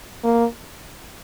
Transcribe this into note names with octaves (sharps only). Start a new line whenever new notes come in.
A#3